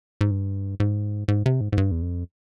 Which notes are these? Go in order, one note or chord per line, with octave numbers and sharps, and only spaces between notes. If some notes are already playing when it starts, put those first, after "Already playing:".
G#2
G2
G#2
G#2
C3
G#2
G#2
G2
E2
F2